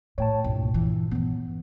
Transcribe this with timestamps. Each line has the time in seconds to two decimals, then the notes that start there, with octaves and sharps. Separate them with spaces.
0.18 A2 C#5 G5 A5
0.44 C2 G2 A#2
0.74 E3
1.11 E3 B3